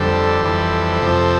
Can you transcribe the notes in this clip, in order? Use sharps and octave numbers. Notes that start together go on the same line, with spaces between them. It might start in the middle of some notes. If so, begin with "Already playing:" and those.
Already playing: F2 D3 G3 A4 C5
F2 E3 G3
F2 C3 F3